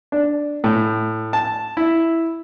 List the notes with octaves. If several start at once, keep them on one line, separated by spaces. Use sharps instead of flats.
D4
A2
A5
E4